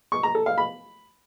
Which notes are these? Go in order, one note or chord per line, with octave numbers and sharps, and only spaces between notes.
C#6
A#5
A4
F5
B5